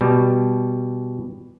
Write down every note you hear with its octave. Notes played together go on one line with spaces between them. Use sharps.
B2 G3